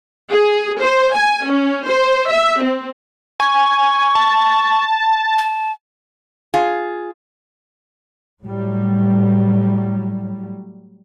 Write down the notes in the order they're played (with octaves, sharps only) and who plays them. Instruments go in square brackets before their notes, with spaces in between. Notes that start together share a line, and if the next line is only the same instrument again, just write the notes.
[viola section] G#4
C5
G#5
C#4
C5
E5
C4
[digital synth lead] G#5 [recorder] C#6
[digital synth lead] A5
[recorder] A5
[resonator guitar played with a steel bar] F4 G#4
[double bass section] A2 F#3 G3